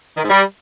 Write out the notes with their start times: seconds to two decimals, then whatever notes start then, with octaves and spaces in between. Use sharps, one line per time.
0.17 D#3
0.23 G#2
0.30 G3